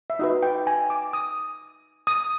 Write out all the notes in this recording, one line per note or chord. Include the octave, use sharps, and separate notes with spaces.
E5
D#4 F#4 B4 D#5
G5
G#5
D6
D#6
D#6